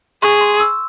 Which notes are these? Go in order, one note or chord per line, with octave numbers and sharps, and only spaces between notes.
G#4 C#6
C6
E6